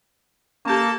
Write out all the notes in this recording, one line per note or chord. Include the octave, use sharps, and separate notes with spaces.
A#3 C#4 G4 A4 A5